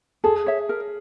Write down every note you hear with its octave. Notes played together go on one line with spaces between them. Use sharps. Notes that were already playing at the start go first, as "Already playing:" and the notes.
G#4 A4
C#5 E5
A#4